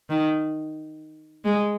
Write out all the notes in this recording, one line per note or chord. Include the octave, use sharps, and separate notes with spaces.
D#3
G#3